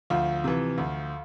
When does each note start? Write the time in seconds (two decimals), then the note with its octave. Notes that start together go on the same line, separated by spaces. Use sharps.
0.10 D2 F3 F4
0.44 C3 E3
0.78 D2